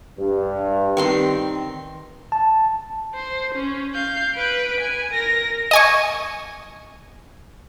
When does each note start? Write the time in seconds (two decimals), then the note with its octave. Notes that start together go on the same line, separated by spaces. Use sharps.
0.19 G2
0.97 D#3 C4 C6
2.32 A5
3.15 C5
3.55 C#4
3.94 F5 G6
4.36 B4 D7
4.81 G#5
5.13 A#4 A#6
5.71 D#5 G#5 C#6